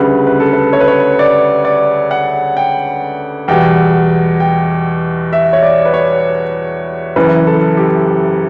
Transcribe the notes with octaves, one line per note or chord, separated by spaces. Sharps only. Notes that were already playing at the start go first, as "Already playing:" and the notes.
Already playing: D2 C#3 G3 B4
B4
A4
B4
C#5
B4
C#5
D5
D5
F#5
G5
E2 B2 G3 G5
G5
E5
C#5
D5
B4
C#5
F#1 F#2 E3 B4
A4
G4